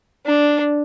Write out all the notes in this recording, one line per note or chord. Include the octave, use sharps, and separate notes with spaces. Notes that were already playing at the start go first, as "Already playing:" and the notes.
D4